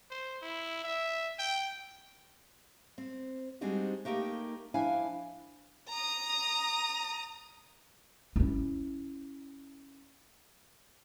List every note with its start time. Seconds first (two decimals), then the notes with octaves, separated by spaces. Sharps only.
0.10 C5
0.42 E4
0.84 E5
1.39 G5
2.98 C4
3.61 G3 G#3 C4 D4 D#4 F#4
4.05 A3 A#3 D#4 G4 A#4
4.74 F3 D4 E4 F5 G#5
5.89 A#5 D#6
8.36 C#4 E4